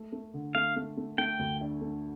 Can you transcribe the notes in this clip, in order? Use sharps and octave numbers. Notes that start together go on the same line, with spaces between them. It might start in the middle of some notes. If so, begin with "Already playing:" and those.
Already playing: A3
A3
D3
A3 F5
A3
A3
A3 G5
D2
D4
A3